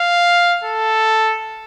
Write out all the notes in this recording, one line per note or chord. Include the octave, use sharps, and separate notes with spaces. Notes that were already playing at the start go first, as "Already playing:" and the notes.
Already playing: F5
A4